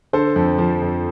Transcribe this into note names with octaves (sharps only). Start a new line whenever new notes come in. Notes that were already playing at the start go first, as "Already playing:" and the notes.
D3 A4 C5
F2
F3
F2